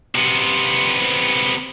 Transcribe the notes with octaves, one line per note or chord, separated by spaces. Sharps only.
C3 B3